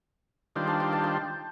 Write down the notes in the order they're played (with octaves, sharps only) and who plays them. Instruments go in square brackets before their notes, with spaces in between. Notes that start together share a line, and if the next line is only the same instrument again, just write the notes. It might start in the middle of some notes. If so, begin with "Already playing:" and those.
[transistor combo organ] D#3 G3 D4 F4 C5 [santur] G5
[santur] A5
G5
A5
G5